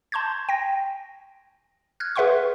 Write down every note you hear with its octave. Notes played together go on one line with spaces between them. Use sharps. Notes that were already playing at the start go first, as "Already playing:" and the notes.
A5 C6 C#6 G6 G#6
G5 A#6
F6 F#6 G#6
G#4 B4 E5 F#5 C6 C#6